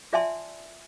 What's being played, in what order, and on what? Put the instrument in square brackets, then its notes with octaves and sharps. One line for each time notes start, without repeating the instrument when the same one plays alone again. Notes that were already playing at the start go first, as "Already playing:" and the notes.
[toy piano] F4 D5 E5 G#5 A5 C6